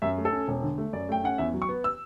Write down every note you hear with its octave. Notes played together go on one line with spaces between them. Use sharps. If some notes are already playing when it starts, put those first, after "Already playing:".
F#2 E5
A3
A4
C#4
E1
D3
A3
F#2 D5
A3 G5
C#4 F#5
E2 E5
F#3
C#6
B3
E6